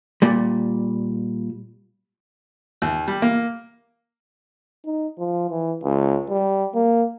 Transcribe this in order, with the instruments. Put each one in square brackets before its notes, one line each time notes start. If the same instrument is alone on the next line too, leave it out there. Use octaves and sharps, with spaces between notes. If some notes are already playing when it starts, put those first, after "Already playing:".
[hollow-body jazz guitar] A#2 G3
[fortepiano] D#2
G3
A#3
[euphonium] D#4
F3
E3
C#2
G3
A#3